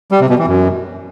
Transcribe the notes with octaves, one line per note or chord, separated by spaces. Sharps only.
G3
C3
B2
E3
F#2